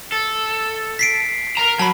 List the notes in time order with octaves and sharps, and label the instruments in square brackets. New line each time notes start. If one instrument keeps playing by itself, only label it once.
[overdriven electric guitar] A4
[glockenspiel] B6 C7 D7
[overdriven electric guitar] A#4 A#5
[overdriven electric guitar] F#3 [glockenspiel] A5 B5